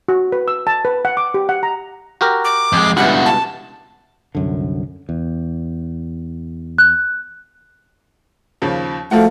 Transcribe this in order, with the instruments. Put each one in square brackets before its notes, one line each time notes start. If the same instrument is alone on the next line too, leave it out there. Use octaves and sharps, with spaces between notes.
[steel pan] F#4
B4
E6
A5
B4
F#5
D6
G4
F#5
A#5
[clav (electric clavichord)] F#4 G4 A#4
[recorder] D6
[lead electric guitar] F2 G#3
[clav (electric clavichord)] C#2 G2 B2 [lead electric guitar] E4 F#4 [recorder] F#5
[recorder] A5
[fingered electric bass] C2 F#2 D3
E2
[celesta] F#6
[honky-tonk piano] D#2 C#3 F3
[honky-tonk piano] F3 F4 F#4 [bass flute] A3